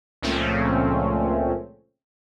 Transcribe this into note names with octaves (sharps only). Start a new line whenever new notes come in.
C#2 A#2 F3 A3 C4 C#4